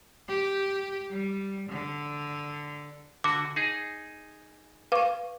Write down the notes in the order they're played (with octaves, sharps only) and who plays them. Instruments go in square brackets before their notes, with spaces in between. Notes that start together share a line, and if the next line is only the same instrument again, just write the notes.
[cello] G4
G3
D3
[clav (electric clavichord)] D3 F#4 [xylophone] D6
[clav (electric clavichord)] D#4 G#4
[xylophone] B4 C#6 [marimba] F5 D6